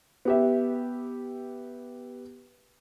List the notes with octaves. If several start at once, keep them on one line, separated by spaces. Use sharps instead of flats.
B3 G4 E5